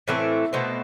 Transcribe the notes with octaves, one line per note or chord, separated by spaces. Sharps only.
A2 E3 A3 C4 E5
B2 A3 C4